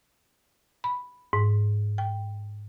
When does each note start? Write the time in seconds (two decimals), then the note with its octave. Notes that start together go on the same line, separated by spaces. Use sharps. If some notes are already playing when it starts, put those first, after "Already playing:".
0.84 B5
1.33 G#2
1.98 G5